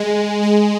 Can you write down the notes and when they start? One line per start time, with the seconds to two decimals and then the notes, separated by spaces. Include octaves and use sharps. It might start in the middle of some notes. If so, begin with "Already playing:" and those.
Already playing: G#3
0.43 G#3